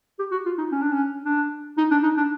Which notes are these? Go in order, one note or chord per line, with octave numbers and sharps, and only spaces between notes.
G4
F#4
F4
D#4
C#4
D4
C#4
D4
D#4
D4
D#4
D4